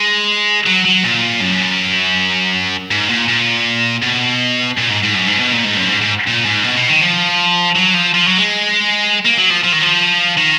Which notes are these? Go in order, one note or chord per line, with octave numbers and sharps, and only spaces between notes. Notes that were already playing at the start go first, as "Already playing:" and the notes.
Already playing: G#3
F#3
F#3
A#2
F#2
G#2
A#2
A#2
B2
A#2
G#2
G#2
F#2
G#2
B2
A#2
G#2
F#2
G#2
G#2
A#2
G#2
B2
B2
D#3
F3
F#3
F3
F3
F#3
G#3
A#3
F#3
F3
F3
D#3
F3
D#3